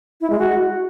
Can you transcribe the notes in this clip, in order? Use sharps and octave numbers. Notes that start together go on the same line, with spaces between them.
E4
G#3
F#4